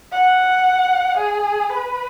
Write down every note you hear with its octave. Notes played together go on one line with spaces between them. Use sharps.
F#5
G#4
B4